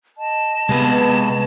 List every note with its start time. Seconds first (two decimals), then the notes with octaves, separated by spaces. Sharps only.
0.18 D#5 A5
0.69 C3 G#3 B3 B4